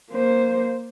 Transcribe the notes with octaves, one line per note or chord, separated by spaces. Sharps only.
A#3 C5